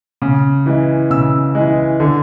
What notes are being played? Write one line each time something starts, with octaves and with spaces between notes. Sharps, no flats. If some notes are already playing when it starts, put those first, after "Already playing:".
C#3
E3 G#3
C#3 E6
E3 G#3
D3